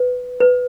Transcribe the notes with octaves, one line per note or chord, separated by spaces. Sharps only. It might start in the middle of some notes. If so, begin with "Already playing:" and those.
Already playing: B4
B4